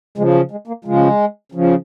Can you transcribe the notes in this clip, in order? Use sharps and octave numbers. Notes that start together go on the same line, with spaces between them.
C#3 F3 G#3
F#3
G#3
A#3
C#3 F3 G#3
C#3 F3